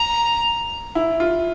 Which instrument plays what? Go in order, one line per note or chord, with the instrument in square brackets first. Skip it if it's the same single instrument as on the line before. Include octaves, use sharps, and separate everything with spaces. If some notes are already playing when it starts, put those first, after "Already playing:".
Already playing: [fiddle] A#5
[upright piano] E4
F4